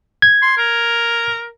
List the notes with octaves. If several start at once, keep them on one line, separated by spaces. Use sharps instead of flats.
G#6
C6
A#4